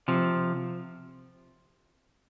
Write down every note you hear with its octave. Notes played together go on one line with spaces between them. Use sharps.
C3 F3